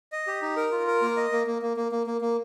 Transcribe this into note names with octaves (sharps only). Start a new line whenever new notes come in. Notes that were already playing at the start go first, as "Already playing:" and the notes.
D#5
G4
D#4
A#4
F4
A#4
A#3
D#5
A#3
A#3
A#3
A#3
A#3
A#3
A#3